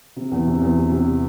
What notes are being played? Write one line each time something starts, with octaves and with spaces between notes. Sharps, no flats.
C3
E2
C3
E2
C3
C3